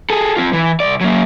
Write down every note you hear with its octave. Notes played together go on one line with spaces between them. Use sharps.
G#4 A4
C4 F4
E3
C2 D5
F#3 A#3